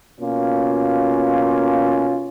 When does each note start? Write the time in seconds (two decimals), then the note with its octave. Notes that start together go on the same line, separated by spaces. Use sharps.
0.19 B2 A#3 C#4 F4